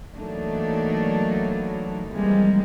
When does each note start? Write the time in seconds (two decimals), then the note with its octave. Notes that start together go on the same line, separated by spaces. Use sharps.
0.15 E3 F#3 A3 A#3 D4 D#4
2.10 C3 E3 F3 G3 G#3 A#3